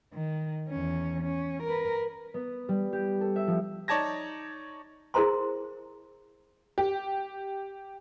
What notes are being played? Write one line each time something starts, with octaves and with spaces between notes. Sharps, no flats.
D#3
E2 C#4
C#4
A#4 B4
B3
G3
G4
A4
E5
F3
D#4 C#5 D5 A5 G#6 A#6
E4 G#4 A#4 C5 A#5 C6
G4